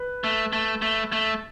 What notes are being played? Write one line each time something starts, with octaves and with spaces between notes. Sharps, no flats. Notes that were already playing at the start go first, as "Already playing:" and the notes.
Already playing: B4
A3
A3
A3
A3